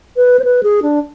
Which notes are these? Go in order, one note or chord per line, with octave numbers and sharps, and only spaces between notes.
B4
C5
B4
G#4
D4